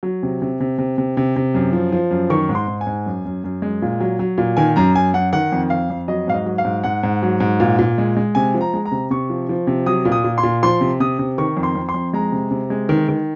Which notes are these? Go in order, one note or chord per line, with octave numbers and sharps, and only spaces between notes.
F#3
C3
C3
C3
C3
C3
C3
C3
F#2
F3
F3
F#2
D#3 C#6
G#2
C6
G#2
G#5
G#2
F#2
F#2
F#2
G#3
A#2
F#3
F#3
A#2
D#3 G#5
F#2 A#5
F#2 G#5
F#2 F#5
D#3 F#5
F2
F2 F5
F2
F#3 D#5
G#2 F5
D#5
F#3
F5
G#2
G#2 F#5
G#2
F#3
G#2
A#2
A#2
G#3
G#3
C3 G#5
F3
A#5
G#3
A#5
C3
C3 C#6
F3
F3
C3
F#3 D#6
A#2
D#6
A#2
C6
A#2
F3 C6
C3
C3 D#6
C3
D#3 C#6
F2
C6
F2
C6
F2
G#3 A#5
C3
C3
G#3
D#3
D#3